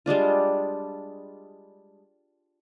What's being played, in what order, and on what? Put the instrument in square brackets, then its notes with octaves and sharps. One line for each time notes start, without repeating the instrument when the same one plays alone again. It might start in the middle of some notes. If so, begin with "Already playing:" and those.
[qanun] G3 G#3 D4 F4